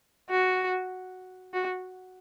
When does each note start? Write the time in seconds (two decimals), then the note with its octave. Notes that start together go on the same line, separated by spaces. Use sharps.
0.30 F#4
1.54 F#4